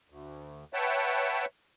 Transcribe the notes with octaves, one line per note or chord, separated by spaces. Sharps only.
D2
B4 C#5 E5 F#5 G5 A5